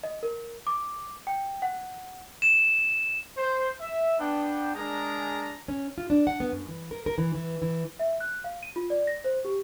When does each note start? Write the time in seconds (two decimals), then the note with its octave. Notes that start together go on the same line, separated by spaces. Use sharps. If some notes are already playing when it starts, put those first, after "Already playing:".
0.04 D#5
0.23 A#4
0.67 D6
1.27 G5
1.62 F#5
2.42 E7
3.37 C5
3.80 E5
4.19 B3 D4 G5
4.75 G#3 D4 G#4 A#4 G#5 A#5
5.68 C#4
5.98 F4
6.10 D4
6.27 F#5
6.40 B3
6.52 F#2
6.68 E3
6.91 A#4
7.06 A#4
7.18 E3
7.35 E3
7.62 E3
7.99 E5
8.20 F#6
8.44 F5
8.63 D#7
8.76 F4
8.90 D5
9.07 A#6
9.24 C5
9.45 G4